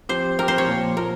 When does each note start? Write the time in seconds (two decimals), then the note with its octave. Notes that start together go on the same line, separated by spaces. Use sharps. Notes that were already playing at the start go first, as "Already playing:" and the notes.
0.09 F3 C4 G4 C5
0.39 F3 C4 G4 A#4
0.48 C5
0.58 C#5
0.68 A#2 F3 A#3
0.97 A#2 F3 A#4